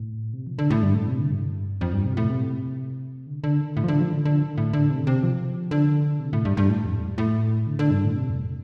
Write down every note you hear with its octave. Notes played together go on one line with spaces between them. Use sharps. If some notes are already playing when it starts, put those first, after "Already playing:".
Already playing: A2
C3
F3
D3
A2
G2
A2
C3
D3
G2
F2
G2
C3
A2
C3
D3
D3
A2
F3
D3
F3
D3
D3
A2
D3
C3
C3
F3
D3
C3
A2
G2
G2
A2
F2
A2
D3
D3
G2
A2
C3
F2